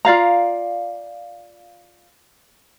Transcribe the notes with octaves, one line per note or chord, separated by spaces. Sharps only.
F4 D5 F5 A#5